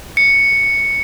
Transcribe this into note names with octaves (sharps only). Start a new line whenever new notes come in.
C#7